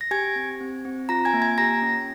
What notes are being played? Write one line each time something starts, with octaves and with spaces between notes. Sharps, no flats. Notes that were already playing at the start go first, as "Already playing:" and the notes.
A#6
G4 G#5 G#6
C4
C4
C4
F4 A#5 A#6
G#5 G#6
A#3
G#5 G#6
G4 A#5 A#6
C#4